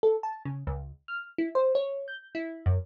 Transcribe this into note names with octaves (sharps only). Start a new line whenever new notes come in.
A4
A5
C#3
C#2
F6
E4
C5
C#5
G6
E4
F#2